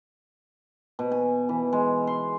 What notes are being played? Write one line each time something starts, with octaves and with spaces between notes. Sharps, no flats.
B2
G#5
E3
G#3
C6